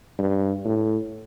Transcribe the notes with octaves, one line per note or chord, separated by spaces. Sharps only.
G2
A2